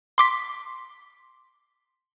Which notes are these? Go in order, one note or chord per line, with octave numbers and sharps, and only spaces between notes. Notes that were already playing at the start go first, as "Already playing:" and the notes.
C6 D6 B6